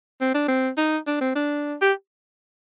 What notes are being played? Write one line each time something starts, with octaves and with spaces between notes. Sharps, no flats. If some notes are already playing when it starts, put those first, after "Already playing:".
C4
D4
C4
D#4
D4
C4
D4
G4